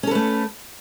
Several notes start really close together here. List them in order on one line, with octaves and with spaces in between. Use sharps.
C#4 A4 B4 A3